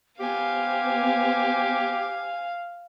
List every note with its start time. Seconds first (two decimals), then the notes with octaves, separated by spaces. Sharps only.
0.20 B3 G4 C5 F5 G#5